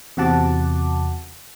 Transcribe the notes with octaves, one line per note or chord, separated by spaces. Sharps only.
E2 C3 F#4 F#5 A5 D6